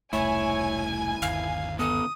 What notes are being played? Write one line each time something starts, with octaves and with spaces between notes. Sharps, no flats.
E1 C2 A3 E4 C#5 G#5
G1 D#2 F5
B3 A4 D#6